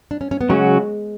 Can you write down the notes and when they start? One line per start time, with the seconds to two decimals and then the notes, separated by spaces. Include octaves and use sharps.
0.11 D4
0.21 C#4
0.31 C#4
0.41 B3
0.49 C#3 F#3 G#3 C#4 F#4